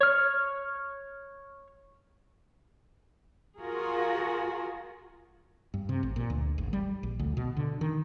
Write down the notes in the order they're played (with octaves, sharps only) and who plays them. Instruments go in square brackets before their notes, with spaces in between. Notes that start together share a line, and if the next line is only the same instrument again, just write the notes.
[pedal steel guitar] C#5 F6
[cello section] F4 F#4 G#4 A#4
[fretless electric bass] G2
C3
A1
A#2
D2
G#1
G3
A#1
D2
B2
D3
D#3